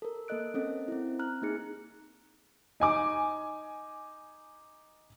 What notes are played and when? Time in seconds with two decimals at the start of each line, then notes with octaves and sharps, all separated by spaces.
0.02 A4 A#4
0.28 A#3 A4 A#4 D#5 F#6 D7
0.54 C4 C#4 A4 D#5
0.88 C4 E4
1.19 A#5 F6 F#6
1.42 A#3 D#4 G#4 C#7
2.80 D#4 G#5 D6